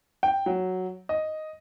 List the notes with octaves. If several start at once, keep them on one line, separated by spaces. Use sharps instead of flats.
G5
F#3
D#5